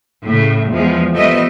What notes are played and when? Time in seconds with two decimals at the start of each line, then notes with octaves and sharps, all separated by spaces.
0.25 A2 C#3
0.70 E2 F3 G#3
1.13 F3 G3 A3 B3 D#5 E5